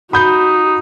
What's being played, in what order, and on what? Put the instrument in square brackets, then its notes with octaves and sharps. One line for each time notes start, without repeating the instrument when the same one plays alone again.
[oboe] D#4 [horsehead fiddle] F#4 [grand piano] B5 D#6 G6